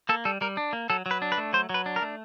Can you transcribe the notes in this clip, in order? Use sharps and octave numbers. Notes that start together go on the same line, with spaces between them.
A#3 A4
G3 A4
G3 A#4
D4
A#3
F#3 A4
F#3
B4
D4
B4
A3
F#3 C5
F#3 B4
D4
A#4
A3